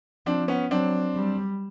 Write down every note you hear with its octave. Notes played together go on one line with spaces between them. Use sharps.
F3 C4 D4
B3 C#4
F#3 C4 D4
G3